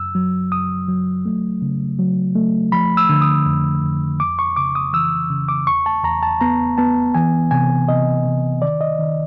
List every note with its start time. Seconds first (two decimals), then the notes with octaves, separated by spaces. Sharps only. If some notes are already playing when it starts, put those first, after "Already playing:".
Already playing: F#2 E6
0.15 F#3
0.51 F#2 D#6
0.88 F#3
1.25 A3
1.62 C#3
1.99 F#3
2.35 A3
2.72 F3 B5
2.97 E6
3.09 D3
3.22 D#6
3.46 F2
3.83 F2
4.20 F2 D6
4.39 C#6
4.57 C#3 D6
4.75 D#6
4.93 E3 E6
5.30 C#3
5.49 D6
5.67 E2 C#6
5.86 A5
6.04 E2 A#5
6.23 A5
6.41 B3 A#5
6.78 B3 A5
7.15 E3 G#5
7.51 C3 G#5
7.89 C3 D#5
8.25 C3
8.62 D#3 D5
8.81 D#5
8.99 D#3